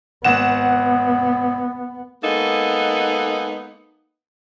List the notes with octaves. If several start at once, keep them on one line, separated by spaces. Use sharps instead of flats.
G#1 B3 F#5 E7
G#3 A#3 B3 D#4 A4